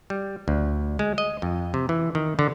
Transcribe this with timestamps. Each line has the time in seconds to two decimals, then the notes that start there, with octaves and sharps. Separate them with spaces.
0.10 G3
0.48 D2
0.99 G#3
1.18 D#5
1.42 F2
1.74 C3
1.89 E3
2.15 D#3
2.39 D3